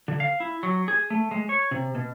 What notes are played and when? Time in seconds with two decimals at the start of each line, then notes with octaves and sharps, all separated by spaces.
0.08 D3
0.20 F5
0.40 E4
0.63 F#3
0.88 G#4
1.10 A3
1.31 G#3
1.49 C#5
1.71 C3
1.95 B2